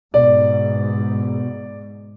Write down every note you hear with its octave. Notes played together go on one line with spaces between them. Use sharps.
G#2 B2 D5